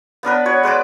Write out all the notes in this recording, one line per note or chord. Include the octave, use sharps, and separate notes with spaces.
B3 D4 A#4 B4
F#4 C#5
G#3 B4 D5 D6